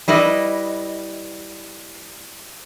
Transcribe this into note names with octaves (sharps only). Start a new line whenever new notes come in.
G3 E4 B4 D#5